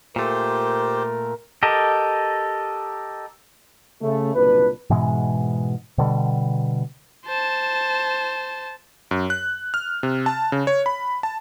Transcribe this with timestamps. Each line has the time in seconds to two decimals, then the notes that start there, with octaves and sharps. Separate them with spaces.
0.16 A#2 A3 G4 A#4 C5
1.63 G4 A4 A#4 D#5
4.02 C#3 A3
4.34 F#1 C2 A#2 D4 B4
4.90 G#2 B2 E3 G#3
5.98 B2 D3 G3
7.26 C5 A5
9.11 F#2
9.30 F#6
9.74 F6
10.03 C3
10.26 A5
10.52 C#3
10.67 C#5
10.86 B5
11.23 A5